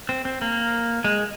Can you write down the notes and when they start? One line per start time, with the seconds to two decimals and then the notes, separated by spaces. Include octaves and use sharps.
0.09 C4
0.25 C4
0.42 A#3
1.04 G#3